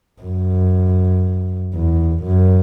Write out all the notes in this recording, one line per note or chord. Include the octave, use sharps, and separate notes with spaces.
F#2
E2
F#2